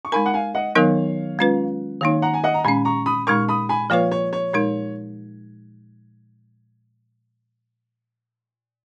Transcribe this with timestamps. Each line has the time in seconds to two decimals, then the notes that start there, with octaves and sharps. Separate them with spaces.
0.05 C#6
0.12 G#3 D#4 A#4 G#5 B5
0.26 F#5
0.34 F5 G#5
0.55 D#5 F#5
0.76 D#3 F#3 B3 D#4 A#4 C#5 F5
1.39 G#3 C#4 F4 B4
2.01 D#3 A#3 D#4 C#5 F5
2.22 F#5 A#5
2.34 G#5
2.44 D#5 F#5
2.54 A#5
2.64 A#2 G#3 C#4 G#5 B5
2.85 A#5 C#6
3.06 B5 D#6
3.27 A#2 G#3 D#4 A#4 C#6 F6
3.49 B5 D#6
3.69 G#5 B5
3.90 F3 A#3 F4 B4 C#5 F5
4.12 C#5
4.33 C#5
4.53 A#2 G#3 D#4 A#4